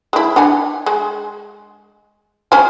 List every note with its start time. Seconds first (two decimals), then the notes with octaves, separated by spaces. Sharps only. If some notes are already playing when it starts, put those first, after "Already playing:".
0.13 G#3 E4
0.36 D4 F#5 G#5
0.86 G#3
2.52 C#4 C5 G#5